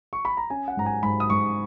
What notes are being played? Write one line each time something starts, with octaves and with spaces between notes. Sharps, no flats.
C#6
B5
A#5
C#4 G#5
F#5
G#2 A#5
G#5
G#2 B5
D#6
G#2 C#6